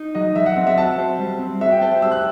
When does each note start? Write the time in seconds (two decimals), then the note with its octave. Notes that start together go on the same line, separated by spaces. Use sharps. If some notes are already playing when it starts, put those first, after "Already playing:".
Already playing: D#4
0.15 F#3 D#5
0.36 F#3 E5
0.46 F#5
0.56 C4 F#5
0.67 E5
0.77 F#4 A5
0.98 C5
1.19 G3
1.39 C4
1.61 F#4 E5
1.71 G5
1.82 C5 A5
2.02 G3 E6
2.12 F#6